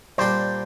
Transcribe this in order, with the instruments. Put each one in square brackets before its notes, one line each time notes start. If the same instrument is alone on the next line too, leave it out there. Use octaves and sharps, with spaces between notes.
[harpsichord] A#2 G3 D4 G4 [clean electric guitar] C5